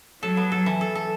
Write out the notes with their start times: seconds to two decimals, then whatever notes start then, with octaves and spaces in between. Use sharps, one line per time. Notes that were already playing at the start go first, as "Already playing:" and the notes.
0.22 F#3 A4
0.37 B3
0.52 A4
0.66 E3
0.81 A4
0.95 A4